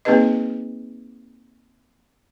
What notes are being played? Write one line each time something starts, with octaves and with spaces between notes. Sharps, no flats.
A#3 C4 D#4 G#4 B4 D#5